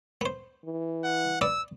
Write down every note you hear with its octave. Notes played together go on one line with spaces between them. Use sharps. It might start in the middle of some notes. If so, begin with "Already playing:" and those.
B3 C5
E3
F#5
B3 D5 D#6 E6